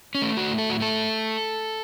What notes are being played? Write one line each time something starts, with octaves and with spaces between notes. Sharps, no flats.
C#4
A3
F#4
A2
A4
F#4
A3 A4